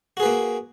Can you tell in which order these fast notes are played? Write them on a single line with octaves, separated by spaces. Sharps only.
F#4 G#4 B4 A#3